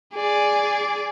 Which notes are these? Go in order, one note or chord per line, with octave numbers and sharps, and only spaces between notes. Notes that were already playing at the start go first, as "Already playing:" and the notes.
G#4 D5